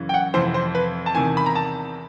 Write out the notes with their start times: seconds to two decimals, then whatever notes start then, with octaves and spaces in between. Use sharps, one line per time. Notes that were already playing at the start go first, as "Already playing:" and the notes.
Already playing: F#2 C#3 E3
0.09 G5
0.14 F#5
0.34 F2 C3 E3 C5
0.54 C5
0.75 B4
1.06 A5
1.15 E2 C3 D#3 G#5
1.37 B5
1.46 A#5
1.55 A5